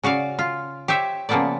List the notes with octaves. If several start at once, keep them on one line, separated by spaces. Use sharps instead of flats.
C#3 F#4 D5 F5
F4
G4 C5 C#5 E5
C#3 F3 A#3 B3 E4 D5